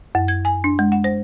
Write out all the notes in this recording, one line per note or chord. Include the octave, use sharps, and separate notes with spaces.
F#2
G#6
G#5
D4
G#3
F#5
C5